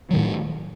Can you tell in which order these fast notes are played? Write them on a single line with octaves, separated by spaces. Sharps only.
F#3 D#3 A2